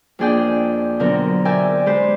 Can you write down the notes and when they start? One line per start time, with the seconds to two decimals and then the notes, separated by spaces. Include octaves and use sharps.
0.19 F2 A#3 D4 G#4 D5 G5
0.99 B2 D3 F#3 C4 A#4 A#5
1.45 A#4 D5 E5 G5 G#5
1.86 G#3 G4 B4 C5